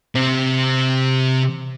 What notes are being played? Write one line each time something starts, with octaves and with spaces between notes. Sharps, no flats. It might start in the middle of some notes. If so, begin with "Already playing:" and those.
C3 C4